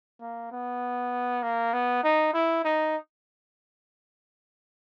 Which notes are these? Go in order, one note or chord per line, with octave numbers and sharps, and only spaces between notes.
A#3
B3
A#3
B3
D#4
E4
D#4